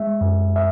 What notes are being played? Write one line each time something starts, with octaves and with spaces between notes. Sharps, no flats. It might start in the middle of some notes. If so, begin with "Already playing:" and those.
Already playing: G#3 E5
F#2
E5